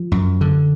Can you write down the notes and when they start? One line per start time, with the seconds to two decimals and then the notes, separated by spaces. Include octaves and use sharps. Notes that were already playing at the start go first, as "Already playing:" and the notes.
Already playing: F3
0.12 F#2
0.41 D3